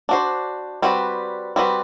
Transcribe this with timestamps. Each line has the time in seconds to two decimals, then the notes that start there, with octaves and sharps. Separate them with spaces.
0.09 D4 F#4 C5
0.82 G3 C4 F#4 B4
1.56 G3 C4 F#4 B4